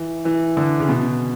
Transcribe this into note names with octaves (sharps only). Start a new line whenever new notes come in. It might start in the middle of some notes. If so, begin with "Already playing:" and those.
Already playing: E3
E3
D3
C#3
B2